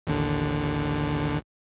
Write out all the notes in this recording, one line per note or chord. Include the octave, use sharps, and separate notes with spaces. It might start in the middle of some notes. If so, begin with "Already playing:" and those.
A1 D#2 D3